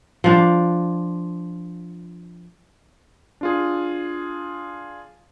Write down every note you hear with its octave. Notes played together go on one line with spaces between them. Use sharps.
F3 D4
D4 F4 G#4